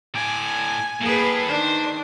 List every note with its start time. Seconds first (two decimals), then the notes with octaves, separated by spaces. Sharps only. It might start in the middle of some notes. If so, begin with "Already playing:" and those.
0.15 A2 D5 G#5
1.01 A2 A#3 G#4 B4
1.49 D#3 D4 C5